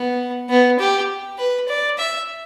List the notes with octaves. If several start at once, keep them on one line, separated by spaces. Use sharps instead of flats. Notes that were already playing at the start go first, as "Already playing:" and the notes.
Already playing: B3
B3
G4
B4
D5
E5